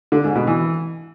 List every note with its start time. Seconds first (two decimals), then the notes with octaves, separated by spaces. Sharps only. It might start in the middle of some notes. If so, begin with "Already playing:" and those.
0.12 D3
0.24 G#2
0.36 B2
0.47 E3